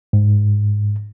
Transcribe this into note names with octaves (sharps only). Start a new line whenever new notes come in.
G#2